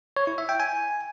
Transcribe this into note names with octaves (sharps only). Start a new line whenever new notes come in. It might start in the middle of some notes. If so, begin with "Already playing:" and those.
C#5
E4
E5
G5
G#5